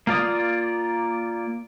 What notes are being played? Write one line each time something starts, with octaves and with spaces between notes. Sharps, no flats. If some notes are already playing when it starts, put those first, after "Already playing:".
A#3 F4 D5 D#6